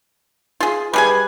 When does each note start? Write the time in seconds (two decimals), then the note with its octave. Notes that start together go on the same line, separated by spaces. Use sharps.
0.60 F4 G#4
0.93 G3 G#4 B4 G#5